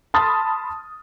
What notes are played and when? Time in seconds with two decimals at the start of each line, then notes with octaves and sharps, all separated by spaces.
0.14 A5 B5 C6 D#6 F6 A6